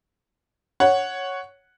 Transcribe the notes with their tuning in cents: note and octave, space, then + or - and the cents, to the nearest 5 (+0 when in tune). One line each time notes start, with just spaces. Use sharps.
C#5 +0 F#5 +0